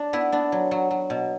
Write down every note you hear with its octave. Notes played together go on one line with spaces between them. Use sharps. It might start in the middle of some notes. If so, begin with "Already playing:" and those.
Already playing: D4
B3 E4
B3 D4
F#3
F#3
F#3
B2